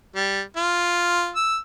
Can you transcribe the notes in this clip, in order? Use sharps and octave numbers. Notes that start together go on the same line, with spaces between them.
G3
F4
E6